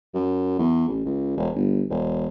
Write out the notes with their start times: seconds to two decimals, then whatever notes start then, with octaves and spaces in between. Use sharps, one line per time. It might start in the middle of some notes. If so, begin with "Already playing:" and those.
0.14 F#2
0.59 E2
0.89 A1
1.05 C#2
1.37 E1
1.55 G1
1.90 E1